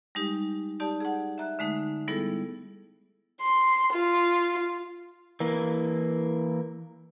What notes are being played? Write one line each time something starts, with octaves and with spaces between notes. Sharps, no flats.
G3 G#3 D#4 G4
D#4 G4 D5 A5
G#4 F#5
E5 A#5 F#6
D3 G#3 A3 D#4
G3 B3 E4 G#4 A4
C6
F4
E3 A#3